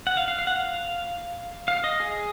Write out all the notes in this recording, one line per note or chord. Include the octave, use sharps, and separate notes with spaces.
F#5
F5
F5
F5
F#5
F5
F5
D#5
G#4